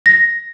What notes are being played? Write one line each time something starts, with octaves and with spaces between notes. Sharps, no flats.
A#6